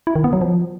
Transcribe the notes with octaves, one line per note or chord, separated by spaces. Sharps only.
E4
D#3
B3
F#3
F3